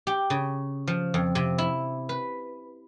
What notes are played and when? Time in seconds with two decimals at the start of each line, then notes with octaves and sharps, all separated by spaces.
0.07 G4
0.30 C#3
0.87 F3
1.14 F2
1.35 C3
1.58 E4
2.09 B4